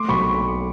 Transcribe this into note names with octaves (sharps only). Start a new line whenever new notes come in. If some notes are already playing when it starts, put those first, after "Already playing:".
Already playing: A3 C6 D6
B1 B5 C#6